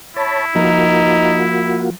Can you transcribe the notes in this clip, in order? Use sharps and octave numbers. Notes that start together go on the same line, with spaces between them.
E4 C#5 A5 B5
F3 A#3 D#4 F4 F#4 A#4